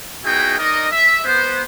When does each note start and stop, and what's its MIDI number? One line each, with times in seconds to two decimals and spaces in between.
0.25 0.57 59
0.25 0.57 63
0.25 0.57 64
0.25 0.57 66
0.25 0.57 68
0.25 0.57 79
0.58 0.87 63
0.58 0.87 70
0.58 0.87 74
0.58 0.87 75
0.92 1.21 76
1.25 1.62 59
1.25 1.62 72